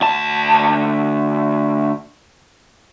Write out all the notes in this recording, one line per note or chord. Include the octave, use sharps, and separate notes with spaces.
D2 A5